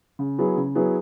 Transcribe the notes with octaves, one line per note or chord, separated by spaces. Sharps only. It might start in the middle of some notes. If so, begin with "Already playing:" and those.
C#3
F#3 B3 E4 G#4
C#3
F#3 B3 E4 G#4